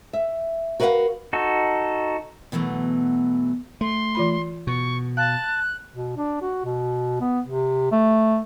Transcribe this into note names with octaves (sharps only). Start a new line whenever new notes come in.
E5
F#4 A#4 B4 C#5 F5 F#5
D#4 F#4 A4
B2 E3 F#3 A3
A3 C6
E3 F4 B5
B2 C#6
F5 A5 F#6
B2
D4
F#4
B2
B3
C3
A3